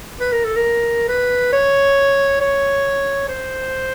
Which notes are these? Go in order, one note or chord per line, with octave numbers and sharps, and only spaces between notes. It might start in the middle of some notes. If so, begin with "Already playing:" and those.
B4
A#4
A4
A#4
B4
C#5
C#5
C5